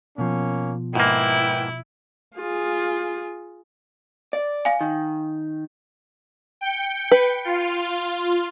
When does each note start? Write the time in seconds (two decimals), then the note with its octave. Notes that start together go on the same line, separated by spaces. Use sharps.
0.18 B2 F3 A#3 C#4
0.95 G#2 A#3 E4 B4 G5
2.36 F4 G#4
4.33 D5
4.65 F5 G#5
4.81 D#3
6.61 G5 C#7
7.11 B4
7.45 F4